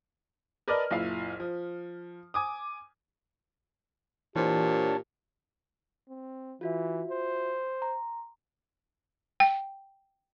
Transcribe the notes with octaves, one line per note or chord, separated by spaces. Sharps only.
A#4 B4 D5 D#5 A5 F6
F#1 A#2 E4 F5
F3
G#5 D6 D#6
A#2 E3 D4 G4 C5 C#5 A5
C4
E3 F4 F#4 E5
C5
A#5 C6
G5